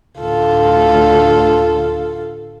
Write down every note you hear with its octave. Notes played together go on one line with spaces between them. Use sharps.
D2 A2 D3 F4 A4